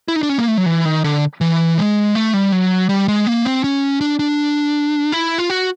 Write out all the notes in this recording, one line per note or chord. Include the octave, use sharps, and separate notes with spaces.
E4
D#4
D4
C#4
A#3
A3
F#3
E3
D#3
D3
E3
G#3
A3
G3
F#3
G3
G#3
A#3
C4
C#4
D4
D4
E4
F4
F#4